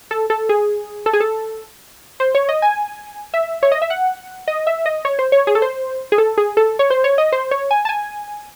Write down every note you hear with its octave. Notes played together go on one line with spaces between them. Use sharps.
A4
A4
G#4
A4
G#4
A4
C5
C#5
D#5
G#5
E5
C#5
D#5
E5
F#5
D#5
E5
D#5
C#5
C5
C#5
G#4
A4
C5
G#4
A4
G#4
A4
C#5
C5
C#5
D#5
C5
C#5
G#5
A5
G#5